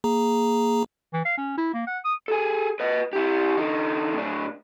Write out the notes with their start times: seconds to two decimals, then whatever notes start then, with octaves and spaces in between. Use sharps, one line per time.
0.04 A#3 G#4 A#5
1.13 E3
1.25 F5
1.37 C#4
1.58 E4
1.74 A#3
1.87 F#5
2.04 D#6
2.28 G#4 A4
2.80 B4 D#5
3.13 E4 G4
3.57 D3 D#4
4.13 A2 D4